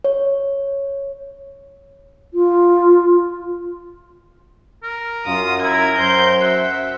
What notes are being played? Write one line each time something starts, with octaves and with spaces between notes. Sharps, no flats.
C#5
F4
A#4
F#2 F4 D#6
E4 A#4 G#6
F#2 C5 C6 G6
E5 F#5